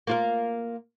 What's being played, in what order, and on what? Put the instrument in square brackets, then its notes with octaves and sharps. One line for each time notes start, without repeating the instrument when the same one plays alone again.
[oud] A#3 F4 A#4